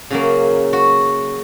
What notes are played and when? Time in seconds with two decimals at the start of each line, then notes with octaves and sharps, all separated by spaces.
0.10 C#3 F#3 A#3
0.73 F#4